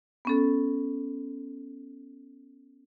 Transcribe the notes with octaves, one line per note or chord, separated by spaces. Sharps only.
B3 C#4 A4